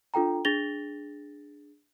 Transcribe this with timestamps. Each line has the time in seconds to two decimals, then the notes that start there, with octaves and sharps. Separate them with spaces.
0.14 D4 F4 A4 G5 A#5
0.45 D4 G#4 A6 A#6 F7 G7